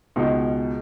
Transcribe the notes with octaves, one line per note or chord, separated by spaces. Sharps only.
C#2 B2 G#3 D#4